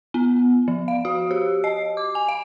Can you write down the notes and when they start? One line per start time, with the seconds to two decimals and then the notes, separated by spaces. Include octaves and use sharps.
0.14 B3
0.68 F3
0.88 F5
1.05 F#4
1.31 G4
1.64 D#5
1.97 D6
2.15 G#5
2.28 F5